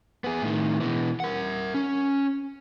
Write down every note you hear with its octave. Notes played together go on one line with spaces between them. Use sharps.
B3 G#4
A2 D#3
B2 E3
A#4 F#5
C#4